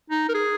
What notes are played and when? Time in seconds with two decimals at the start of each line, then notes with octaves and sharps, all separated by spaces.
0.10 D#4
0.29 A#4
0.34 G#4